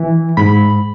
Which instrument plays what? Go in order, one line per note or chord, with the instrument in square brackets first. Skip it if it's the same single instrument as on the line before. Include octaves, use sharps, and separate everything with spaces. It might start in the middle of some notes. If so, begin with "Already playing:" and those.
Already playing: [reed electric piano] E3
G#2 B5